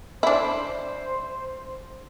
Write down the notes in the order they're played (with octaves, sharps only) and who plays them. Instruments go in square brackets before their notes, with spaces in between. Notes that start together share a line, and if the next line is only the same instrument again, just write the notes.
[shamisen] D4 E4 [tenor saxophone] C5